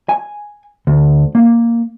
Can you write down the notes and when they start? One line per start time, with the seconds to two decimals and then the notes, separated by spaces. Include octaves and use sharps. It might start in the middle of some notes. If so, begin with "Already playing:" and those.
0.09 G#5
0.87 D2
1.35 A#3